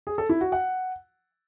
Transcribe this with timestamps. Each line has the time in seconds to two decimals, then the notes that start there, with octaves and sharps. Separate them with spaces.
0.07 G#4
0.18 A4
0.29 E4
0.41 F#4
0.52 F#5